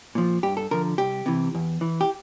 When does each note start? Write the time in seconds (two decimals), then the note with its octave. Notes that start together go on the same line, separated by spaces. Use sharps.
0.15 A#2 F3
0.43 G2 G4
0.57 A4
0.71 D3 F3 A#4
0.98 C2 G4
1.26 C3 E3
1.55 E2
1.81 E3
2.01 G4